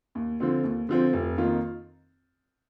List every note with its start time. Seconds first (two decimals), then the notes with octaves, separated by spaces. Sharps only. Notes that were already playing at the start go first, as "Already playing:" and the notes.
0.15 D#2
0.40 D3 F3 C4
0.64 D#2
0.89 D3 F3 C4
1.13 F1
1.37 F2 D#3 A#3 F4